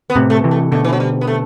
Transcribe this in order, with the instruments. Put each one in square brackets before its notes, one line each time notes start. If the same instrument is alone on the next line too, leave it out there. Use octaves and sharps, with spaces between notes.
[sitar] B3
[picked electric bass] A2 C3
[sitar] A3
[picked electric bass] C3 E3
[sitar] A3
[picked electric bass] B2 D3 [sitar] A3
[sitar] E3
F#3
G3
B3
A3